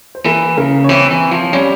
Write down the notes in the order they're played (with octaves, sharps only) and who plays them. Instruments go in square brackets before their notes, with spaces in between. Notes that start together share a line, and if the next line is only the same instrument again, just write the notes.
[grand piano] C5
[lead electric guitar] E3 [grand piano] A#3 A#4
[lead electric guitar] C#3 [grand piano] A#3 A#4
[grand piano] C#5
[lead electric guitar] E3 [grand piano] C4 C5
[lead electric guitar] E3
F3
[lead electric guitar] G3 [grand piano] C#4 C#5